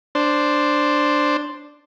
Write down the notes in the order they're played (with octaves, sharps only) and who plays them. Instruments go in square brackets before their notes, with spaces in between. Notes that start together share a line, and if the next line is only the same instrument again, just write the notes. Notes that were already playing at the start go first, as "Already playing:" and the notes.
[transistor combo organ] D4 C5